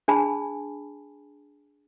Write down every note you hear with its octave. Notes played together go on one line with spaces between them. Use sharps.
D4 G#4 G#5 A5 B5